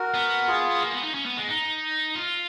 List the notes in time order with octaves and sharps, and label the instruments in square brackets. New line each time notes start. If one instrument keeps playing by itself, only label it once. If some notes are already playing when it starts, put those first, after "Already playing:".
Already playing: [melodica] F#4 A#4
[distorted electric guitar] B3
[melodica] F4 G#4
[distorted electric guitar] A#3
B3
D#4
C#4
B3
G#3
D#4
F4